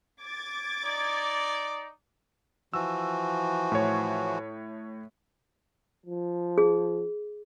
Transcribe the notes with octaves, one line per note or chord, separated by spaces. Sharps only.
D6 G#6 A6
D#4 D5
E3 F3 F#4 E6
A2 C#5
F3
G#4